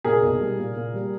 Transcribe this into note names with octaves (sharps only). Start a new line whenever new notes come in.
A#2 G#4 A#4
B1
G3
A#2
A#2
G3